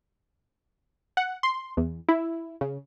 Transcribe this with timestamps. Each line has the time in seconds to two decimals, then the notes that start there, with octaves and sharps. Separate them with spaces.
1.17 F#5
1.43 C6
1.77 E2
2.09 E4
2.61 C#3